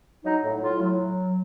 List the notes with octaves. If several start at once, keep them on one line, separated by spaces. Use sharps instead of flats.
F#3 D#4
A2
A2 F4
F#3